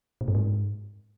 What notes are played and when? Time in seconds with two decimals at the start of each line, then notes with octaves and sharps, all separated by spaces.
0.21 A#2
0.28 G2
0.35 G#2